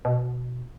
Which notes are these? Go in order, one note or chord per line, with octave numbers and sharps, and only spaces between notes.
B2